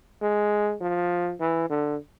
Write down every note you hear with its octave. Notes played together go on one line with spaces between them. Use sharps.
G#3
F3
E3
D3